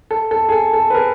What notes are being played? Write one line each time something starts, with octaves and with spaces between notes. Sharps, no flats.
A4
A4
G#4
A4
A4
B4
G#4 A#4